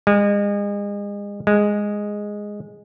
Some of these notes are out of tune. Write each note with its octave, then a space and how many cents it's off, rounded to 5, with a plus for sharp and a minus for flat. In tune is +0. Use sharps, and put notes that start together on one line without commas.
G#3 -35
G#3 -5